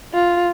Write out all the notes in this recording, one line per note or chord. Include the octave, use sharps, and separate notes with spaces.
F4